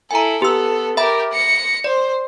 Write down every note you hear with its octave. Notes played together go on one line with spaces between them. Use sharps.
E4 A4 G#5 A#5
B3 G4 A4 E6
G4 A#4 E5 B5
A#6 C#7
C5 D5